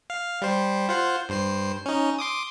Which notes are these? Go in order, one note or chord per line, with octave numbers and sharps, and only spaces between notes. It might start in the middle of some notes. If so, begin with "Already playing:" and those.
F5
G3 C5
F4 C5 F#5
G2 C5 C7
C#4 D#4
C6 D6 D#6